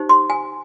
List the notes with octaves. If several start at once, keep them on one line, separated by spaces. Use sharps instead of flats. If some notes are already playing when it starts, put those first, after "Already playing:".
Already playing: D#4 G4 C5
C6
G#5